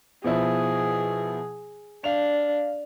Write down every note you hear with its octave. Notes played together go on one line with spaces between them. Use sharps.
B2 F3 E4 G#4
D4 F5 F7